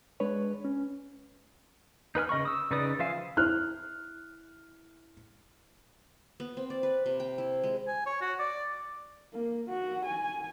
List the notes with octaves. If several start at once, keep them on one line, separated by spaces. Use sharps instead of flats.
G#3 D4 B4 C#5
C#4
D#4 B4 G#5 F6
C#3 D#5 B5 C#6
D#6 E6
C#3 D#4 B4 D5 D#6
F3 F4 E5 F5 G#5
E4 F6 F#6
B3
C4
D5
B4
C3
G5
E4
G#3
G#5
C#5
F#4
D5
A#3
F#4
G#5